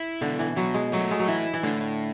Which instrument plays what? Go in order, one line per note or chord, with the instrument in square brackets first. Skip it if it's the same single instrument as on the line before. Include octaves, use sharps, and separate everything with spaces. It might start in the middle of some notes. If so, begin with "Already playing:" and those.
Already playing: [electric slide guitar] E4
[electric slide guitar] B2 [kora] D3
[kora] E3
[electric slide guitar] B2 [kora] F#3
[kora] G#3
[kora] F#3 [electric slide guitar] A3
[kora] G#3
F#3
[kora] E3 [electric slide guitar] E4
[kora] E3
[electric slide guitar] A2 [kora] D3